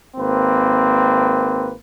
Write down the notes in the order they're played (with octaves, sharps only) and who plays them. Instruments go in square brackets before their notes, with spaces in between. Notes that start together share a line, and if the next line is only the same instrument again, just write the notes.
[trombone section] G#1 A#3 C4 B4